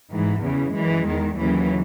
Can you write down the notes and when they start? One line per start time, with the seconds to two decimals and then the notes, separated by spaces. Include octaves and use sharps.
0.12 G#2 E3
0.44 E2 C#3 E3
0.75 F#2 E3 G#3
1.07 E2 D#3
1.38 D#2 C#3 E3 F#3